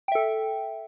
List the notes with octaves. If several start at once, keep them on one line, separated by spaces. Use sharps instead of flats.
A4 E5 G5